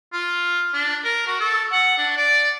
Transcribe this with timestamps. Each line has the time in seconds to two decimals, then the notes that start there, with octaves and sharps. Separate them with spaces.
0.13 F4
0.74 D4
1.04 A#4
1.27 F#4
1.40 A4
1.72 F#5
1.98 D4
2.17 D5